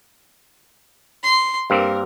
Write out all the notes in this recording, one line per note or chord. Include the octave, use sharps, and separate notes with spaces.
C6
G2 A#3 C4 A#4